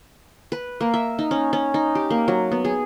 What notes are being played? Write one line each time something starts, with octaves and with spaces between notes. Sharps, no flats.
B4
A#3
E5
D#4
C#4
C#4
D#4
G4
A#3
F#3
B3
G#4